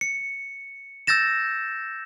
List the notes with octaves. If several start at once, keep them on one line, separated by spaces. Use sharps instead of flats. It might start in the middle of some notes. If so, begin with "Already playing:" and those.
C#7
E6 G6 A6 A#6 E7